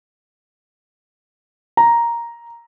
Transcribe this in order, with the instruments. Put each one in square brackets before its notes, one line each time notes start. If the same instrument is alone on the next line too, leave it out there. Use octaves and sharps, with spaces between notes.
[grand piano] A#5